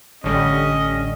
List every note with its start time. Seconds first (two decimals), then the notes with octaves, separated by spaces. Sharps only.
0.24 A1 D3 G3 C#4 D#5